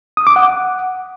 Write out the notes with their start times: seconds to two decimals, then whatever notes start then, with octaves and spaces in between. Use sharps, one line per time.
0.17 D#6
0.27 D6
0.36 F#5